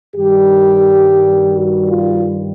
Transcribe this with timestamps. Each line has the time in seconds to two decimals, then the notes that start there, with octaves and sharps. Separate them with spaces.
0.15 G2 D#3 G3 G4
1.54 F#4
1.89 F4